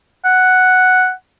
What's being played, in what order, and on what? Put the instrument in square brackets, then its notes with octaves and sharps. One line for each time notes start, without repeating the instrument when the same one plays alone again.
[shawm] F#5